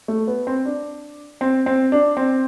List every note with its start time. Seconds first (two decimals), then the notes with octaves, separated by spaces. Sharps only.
0.08 A3
0.27 B3
0.47 C4
0.65 D4
1.41 C4
1.66 C4
1.92 D4
2.17 C4